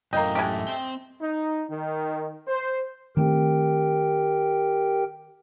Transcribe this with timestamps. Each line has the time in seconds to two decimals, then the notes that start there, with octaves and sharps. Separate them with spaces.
0.13 F#2 A2 A#3 D#5 G5
0.35 G#3 A3 G4
0.68 C4 G5
1.21 D#4
1.70 D#3
2.48 C5
3.17 D#3 A3 C4 G4 A#4 G5